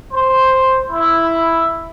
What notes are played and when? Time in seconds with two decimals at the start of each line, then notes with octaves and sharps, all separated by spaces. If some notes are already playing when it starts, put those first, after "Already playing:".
0.12 C5
0.90 E4